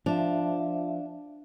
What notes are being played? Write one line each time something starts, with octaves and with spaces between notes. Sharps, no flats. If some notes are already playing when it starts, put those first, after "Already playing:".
F3 D4 E5 F5